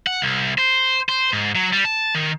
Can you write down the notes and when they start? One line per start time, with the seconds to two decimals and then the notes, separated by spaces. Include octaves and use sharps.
0.07 F#5
0.22 C2
0.58 C5
1.09 C5
1.33 G#2
1.55 F#3
1.73 G3
1.85 A5
2.15 D#3